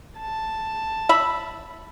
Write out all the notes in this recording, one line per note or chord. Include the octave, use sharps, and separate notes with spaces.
A5
E5 B5